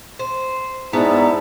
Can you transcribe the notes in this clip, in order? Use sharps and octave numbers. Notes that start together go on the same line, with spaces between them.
C5
G#2 B3 E4 D5 A5 A#5